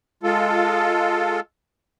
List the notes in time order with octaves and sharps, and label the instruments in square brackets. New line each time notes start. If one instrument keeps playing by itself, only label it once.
[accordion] G#3 F4 A4